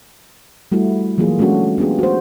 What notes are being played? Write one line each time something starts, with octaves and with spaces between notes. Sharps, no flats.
G3 A3 E4 F#4
E3 F#3 A#3 F4 G#4
G#3 A3 C#4 D4 F#4 A4
B3 D4 F4 G4 G#4
F#4 C5